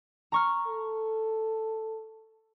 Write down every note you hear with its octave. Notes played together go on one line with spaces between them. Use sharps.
A#5 C#6 F6
A4